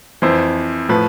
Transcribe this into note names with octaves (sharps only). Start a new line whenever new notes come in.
F2 E3 C5
A2 F3 B4